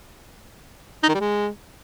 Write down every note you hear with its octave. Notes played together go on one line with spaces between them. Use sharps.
D#4
D#3
G3
G#3